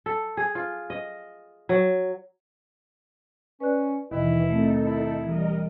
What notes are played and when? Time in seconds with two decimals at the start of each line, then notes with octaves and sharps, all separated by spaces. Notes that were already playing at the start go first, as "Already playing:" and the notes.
0.06 A4
0.37 G#4
0.55 F4
0.90 D#5
1.69 F#3
3.60 C#4 B4 D5 F#6
4.11 D#2 B2 D#3 E3 E4 D#5
4.50 D#3 A3 C4 D#4 A4
4.86 E4
5.24 E3 G3 A#4 D#5